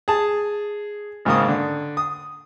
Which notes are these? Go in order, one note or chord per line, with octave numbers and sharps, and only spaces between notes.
G#4 A5
G#1 G#2 C#3 A#3 D#6
D3
D#6